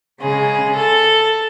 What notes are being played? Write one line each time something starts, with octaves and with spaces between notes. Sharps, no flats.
C#3 G#3 G#4
A4